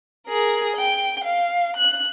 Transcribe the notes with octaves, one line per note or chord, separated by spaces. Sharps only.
G#4 A#4
G5
F5
F#6